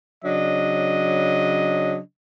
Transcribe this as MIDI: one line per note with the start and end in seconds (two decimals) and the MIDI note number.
0.25 1.98 49
0.25 1.98 54
0.25 1.98 62
0.25 1.98 75